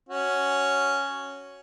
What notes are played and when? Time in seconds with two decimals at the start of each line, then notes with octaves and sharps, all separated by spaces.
0.09 C#4 F#4